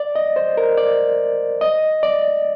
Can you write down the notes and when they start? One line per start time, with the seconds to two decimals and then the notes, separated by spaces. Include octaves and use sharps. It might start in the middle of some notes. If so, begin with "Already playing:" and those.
Already playing: D5
0.15 D#5
0.36 C5
0.57 A#4
0.77 D5
1.61 D#5
2.03 D5